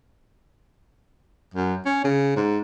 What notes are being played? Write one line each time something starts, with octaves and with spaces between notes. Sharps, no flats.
F#2
C#4
C#3
G#2